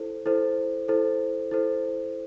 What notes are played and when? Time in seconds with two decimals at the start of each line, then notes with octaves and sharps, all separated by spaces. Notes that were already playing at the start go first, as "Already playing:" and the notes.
Already playing: E4 A4 C5
0.26 E4 A4 C5
0.88 E4 A4 C5
1.51 E4 A4 C5